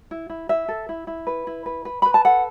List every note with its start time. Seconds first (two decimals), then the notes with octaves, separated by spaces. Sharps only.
0.11 E4
0.30 E4
0.49 E4 E5
0.68 A4
0.89 E4
1.07 E4
1.27 B4
1.47 E4
1.66 B4
1.85 B4
2.02 B4 B5
2.14 A5
2.25 A4 F#5